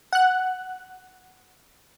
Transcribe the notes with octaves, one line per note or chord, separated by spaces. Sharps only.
F#5 F#6